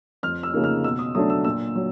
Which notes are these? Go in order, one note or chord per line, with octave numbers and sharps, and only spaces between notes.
F2 F6
E6
C#3 F3 A#3 D#4
F6
B2 E6
D#6
F#3 A3 D4 D#6
E6
A#2 E6
F#3